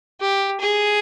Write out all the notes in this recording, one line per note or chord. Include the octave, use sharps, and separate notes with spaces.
G4
G#4